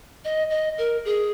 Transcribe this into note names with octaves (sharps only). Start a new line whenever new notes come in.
D#5
D#5
A#4
G#4